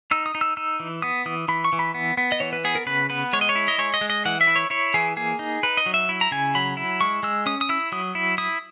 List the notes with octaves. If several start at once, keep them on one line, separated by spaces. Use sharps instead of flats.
D#4 E6
D#6
D#4
E6
D#4 E6
E3
B3 D#6
E3 D#6
E3 B5
C#6
E3
B5
B3
B3
D#5
E3 C#5
B4
B3 G#4
A#4
C#3 B4
B3 B4
G#3 C#5
D#5
C#5
E4
D#5
G#3 C#5
D#5
G#3
D#5
E3 F#5
E5
E4
C#5
E4 C#5
E3 G#4
A#3 G#4
D#4
D#4 B4
D#5
F#3
E5
E4
A#5
C#3 G#5
F#3 B5
E4
G#3 C#6
G#3 E6
C#4 D#6
D#6
E4 E6
F#3 D#6
E4
E4 D#6